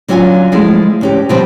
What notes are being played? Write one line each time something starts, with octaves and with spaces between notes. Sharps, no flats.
D3 F#3 C#4 E4 F4 G#5
F3 G#3 A3 E4
D2 C#4 G4
B2 D3 D#3 F3 G3 C4